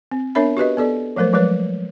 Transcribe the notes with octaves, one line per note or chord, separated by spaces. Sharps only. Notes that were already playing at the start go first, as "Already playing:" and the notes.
C4
B3 D4 A#4 C#5 E5 B5
F#4 G4 B4 D#5
B3 A4 D5
F3 F#3 A3 A#4 C5
F3 F#3 G#3 B4 C#5